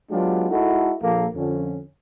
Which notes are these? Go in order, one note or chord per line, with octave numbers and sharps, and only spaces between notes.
F#3 G#3 B3 D4 F4 G4
G#3 D#4 E4 F#4 A4
A#1 A#3 A4
F2 D3 C#4